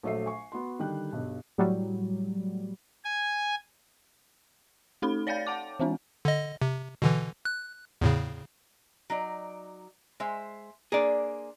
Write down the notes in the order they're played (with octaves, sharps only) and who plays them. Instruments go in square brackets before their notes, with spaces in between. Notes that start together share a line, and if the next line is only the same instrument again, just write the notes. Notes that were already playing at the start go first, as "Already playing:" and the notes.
[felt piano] A#1 F#3 A3 E5 C7
G#5 C#6
B3 F#4 C6
D3 D#3 G3 G5 F#6
B1 G2
[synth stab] A2 F#3 G3
[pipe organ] G#5
[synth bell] A3 D#4 A4 B5
C#5 D5 F5 G5 G6 A6
F#5 A5 D6
E3 G#3 C4 D4
[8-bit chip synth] D3 D#5
C3
B2 D3 E3
F#6
E2 A2 C#3
[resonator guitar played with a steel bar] F#3 D#4 D5
G#3 C5 E5
[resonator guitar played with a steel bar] A#3 D4 C5 [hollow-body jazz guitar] G#4 D5